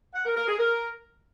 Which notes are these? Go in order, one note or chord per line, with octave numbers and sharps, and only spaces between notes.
F#5
A#4
A#4
G#4
A#4